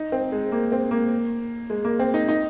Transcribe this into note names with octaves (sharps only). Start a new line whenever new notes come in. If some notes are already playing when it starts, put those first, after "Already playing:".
Already playing: D#4
C4
G#3
A#3
C4
A#3
G#3
A#3
C4
D#4
D#4